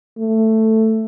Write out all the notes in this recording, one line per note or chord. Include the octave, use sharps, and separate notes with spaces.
A3